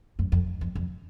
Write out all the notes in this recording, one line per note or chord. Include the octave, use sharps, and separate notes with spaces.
F#2
F2
F2
F2